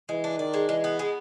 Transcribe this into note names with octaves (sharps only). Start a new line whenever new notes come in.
E3 G#3
D4
D#3 D4
G#3
E3 G#3
B3
G#3